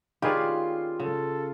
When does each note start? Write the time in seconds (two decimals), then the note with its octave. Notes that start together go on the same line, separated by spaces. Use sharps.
0.22 D#3 C#4 F4 G4 G#4 B4 D5
1.00 C#3 A4